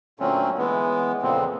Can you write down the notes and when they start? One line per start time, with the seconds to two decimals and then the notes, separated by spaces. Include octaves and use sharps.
0.20 A#2 D3 F#3 A3 C4 C#4
0.58 E3 G#3 B3
1.22 F2 A#2 C#3 F3 C4